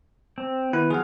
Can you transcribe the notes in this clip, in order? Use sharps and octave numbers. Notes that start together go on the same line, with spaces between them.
C4
D#3 B3 E4 B4
F3 F#3 G#4 F5 F#5